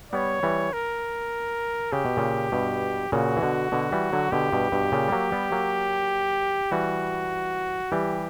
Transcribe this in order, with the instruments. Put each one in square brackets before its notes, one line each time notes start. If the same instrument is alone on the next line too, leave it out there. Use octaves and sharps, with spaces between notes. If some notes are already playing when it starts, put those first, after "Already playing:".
[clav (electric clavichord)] G3 B3 [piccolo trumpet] C#5
[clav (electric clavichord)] E3 G3
[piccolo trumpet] A#4
[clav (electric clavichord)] C#3 [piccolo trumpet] G4
[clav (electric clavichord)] B2
A#2 C#3
G2 B2
[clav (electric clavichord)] A#2 C#3 [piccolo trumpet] F#4
[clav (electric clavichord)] E3
B2 D3
B2 D3
E3 G3
D3 F#3
[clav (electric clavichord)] B2 D3 [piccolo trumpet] G4
[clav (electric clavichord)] G2 B2
G2 B2
A#2 C#3
G3
F#3 A#3
G3 B3
F#3 A#3
[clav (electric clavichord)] E3 G3 [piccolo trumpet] F#4
[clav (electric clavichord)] E3 G3 [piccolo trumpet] G4